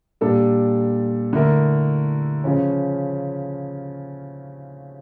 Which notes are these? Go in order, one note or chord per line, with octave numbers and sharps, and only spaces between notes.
A#2 G3 D4 A4
D3 A3 E4 A#4
C#3 F3 C#4